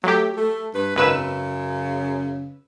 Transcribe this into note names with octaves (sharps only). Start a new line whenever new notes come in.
F#3 A3 G4
A3
G2 B4
G#1 F#2 C#3 B4 E6